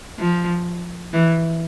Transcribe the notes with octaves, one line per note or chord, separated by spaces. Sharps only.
F3
E3